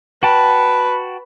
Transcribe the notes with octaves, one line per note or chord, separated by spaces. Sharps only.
F#4 B4 G5 A5